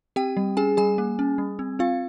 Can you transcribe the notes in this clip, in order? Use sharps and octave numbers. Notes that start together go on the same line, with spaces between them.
C4 G4 G5
G3
C#4 G#4 G#5
G3 G#4 G#5
A#3
C#4
G3
C4
C4 F4 F5